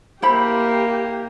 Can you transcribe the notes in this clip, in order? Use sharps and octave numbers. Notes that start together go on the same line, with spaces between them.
A#3 E4 G4 C5 B5